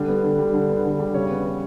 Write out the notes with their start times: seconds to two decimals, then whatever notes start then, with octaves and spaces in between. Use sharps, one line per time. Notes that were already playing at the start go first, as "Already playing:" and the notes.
Already playing: D3 G3
0.08 B3
0.23 D3
0.39 G3
0.54 D3
0.69 B3
0.84 D3
1.00 G3
1.14 C#3 C#5
1.30 B3
1.46 C#3